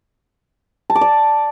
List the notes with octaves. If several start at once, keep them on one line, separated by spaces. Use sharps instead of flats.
A5
D6
D5